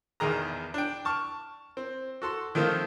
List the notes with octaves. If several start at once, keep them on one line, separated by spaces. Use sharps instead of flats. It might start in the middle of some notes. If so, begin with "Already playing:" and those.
A#1 E2 B2 D#3 G#4 A#5
D4 G5
A5 C#6 F6
C4
F#4 A4 C6
D#3 F3 A3 A#3 C4 F4